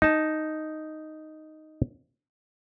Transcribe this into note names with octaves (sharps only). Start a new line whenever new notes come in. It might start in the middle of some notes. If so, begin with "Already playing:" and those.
D#4 A5